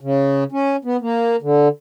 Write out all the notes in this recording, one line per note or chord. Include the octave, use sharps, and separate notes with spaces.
C#3
C#4
B3
A#3
D3